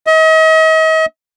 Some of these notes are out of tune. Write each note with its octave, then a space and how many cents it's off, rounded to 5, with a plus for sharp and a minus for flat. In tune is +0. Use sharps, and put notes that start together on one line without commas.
D#5 +40